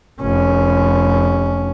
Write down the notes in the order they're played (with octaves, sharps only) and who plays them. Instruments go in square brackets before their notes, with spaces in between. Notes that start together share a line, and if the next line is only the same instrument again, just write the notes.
[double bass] F1 C#4